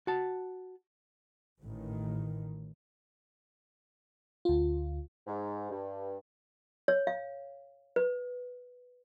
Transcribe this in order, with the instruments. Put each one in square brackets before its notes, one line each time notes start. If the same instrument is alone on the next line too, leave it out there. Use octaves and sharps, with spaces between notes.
[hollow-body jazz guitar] F#4 A5
[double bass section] A1 A2 D#3
[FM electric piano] D2 F4
[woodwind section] G#2
G2
[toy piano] C#5
F5
B4